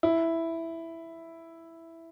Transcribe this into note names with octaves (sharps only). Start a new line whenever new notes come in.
E4